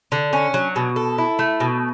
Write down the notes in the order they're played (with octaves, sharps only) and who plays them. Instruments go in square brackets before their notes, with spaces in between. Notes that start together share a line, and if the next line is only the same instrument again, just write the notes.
[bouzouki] D3
C#4
F#3
B2
A4
E4
A3
B2